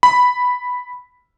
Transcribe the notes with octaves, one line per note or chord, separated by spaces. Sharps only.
B5